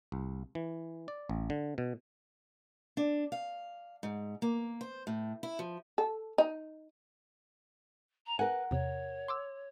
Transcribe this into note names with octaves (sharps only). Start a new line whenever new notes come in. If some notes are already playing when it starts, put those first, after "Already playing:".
C2
E3
D5
A1
D3
B2
D4
F5
G#2
A#3
C5
A2
E4
F3
A4
D#4
A#5
A#4 B4 F#5 G#5
E2 C3 C#5
C6 D6 E6